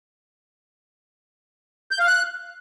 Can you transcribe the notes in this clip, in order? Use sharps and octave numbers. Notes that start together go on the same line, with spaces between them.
G6
F5
F#6